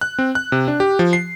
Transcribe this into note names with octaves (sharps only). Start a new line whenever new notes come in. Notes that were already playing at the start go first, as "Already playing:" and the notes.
F#6
C4
F#6
C3
D4
G4
F3
C7